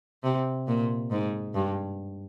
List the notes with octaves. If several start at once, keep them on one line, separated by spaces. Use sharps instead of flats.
C3
A#2
G#2
G2